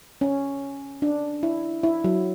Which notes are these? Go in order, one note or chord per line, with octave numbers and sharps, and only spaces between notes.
C#4
D4
E4
E4
F#3